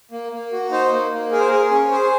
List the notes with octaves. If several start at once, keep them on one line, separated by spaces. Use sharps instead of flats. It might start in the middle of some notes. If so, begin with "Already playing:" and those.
A#3
A#3
F#4
D#4 C5
A#3
A#3
G#4 A#4
C5
G#4 A#4
C#4
G#4 C5